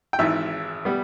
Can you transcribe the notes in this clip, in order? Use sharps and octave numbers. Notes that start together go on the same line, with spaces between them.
G5
G#1 G#2 E3 E5
G3 B3